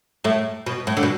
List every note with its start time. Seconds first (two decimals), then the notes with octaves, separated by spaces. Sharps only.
0.24 A2 A3
0.66 B2
0.87 A2
0.97 D3
1.03 B2